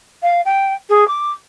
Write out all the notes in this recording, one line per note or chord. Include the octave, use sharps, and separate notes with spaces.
F5
G5
G#4
D6